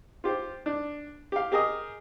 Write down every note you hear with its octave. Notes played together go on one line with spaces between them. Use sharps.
F4 G4 C5
D4
G4 F5
G4 G#4 A#4 D#5 D#6